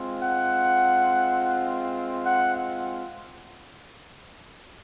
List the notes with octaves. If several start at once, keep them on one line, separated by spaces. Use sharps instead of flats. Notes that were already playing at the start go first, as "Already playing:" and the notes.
Already playing: G#3 C4 F4
F#5
F#5